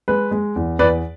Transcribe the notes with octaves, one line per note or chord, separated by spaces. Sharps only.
G#3 B4
G#3
E2
E2 B4 D5